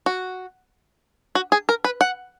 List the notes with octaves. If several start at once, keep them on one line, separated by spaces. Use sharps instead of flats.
F#4
F#4
G#4
A#4
B4
F#5